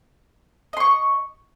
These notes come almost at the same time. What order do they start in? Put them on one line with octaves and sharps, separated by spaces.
D#5 C6 C#6